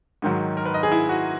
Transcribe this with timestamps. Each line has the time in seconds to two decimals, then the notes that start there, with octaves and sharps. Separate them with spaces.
0.22 G#2 D#3 F#3
0.57 A#4
0.65 B4
0.74 D#5
0.83 G#4
0.92 E4
1.09 F#4